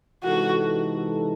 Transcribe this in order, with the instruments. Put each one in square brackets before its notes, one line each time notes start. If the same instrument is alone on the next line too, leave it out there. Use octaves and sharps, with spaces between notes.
[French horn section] C3 E3 G#3 D#4 A4 [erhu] F#4